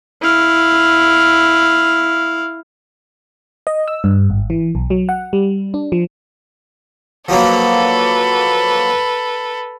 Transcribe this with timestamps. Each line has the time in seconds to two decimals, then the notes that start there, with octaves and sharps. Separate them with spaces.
0.22 E4 F5
3.67 D#5
3.88 E6
4.04 G2
4.30 G#1
4.50 E3
4.75 B1
4.90 F#3
5.09 F#5
5.33 G3
5.74 D4
5.92 F3
7.29 F3 F#3 A#3 A4 B4